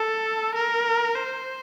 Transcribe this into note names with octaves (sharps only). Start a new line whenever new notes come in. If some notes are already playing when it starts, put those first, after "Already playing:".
Already playing: A4
A#4
C5